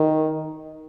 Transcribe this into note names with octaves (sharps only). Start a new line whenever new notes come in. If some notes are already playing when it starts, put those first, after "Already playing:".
Already playing: D#3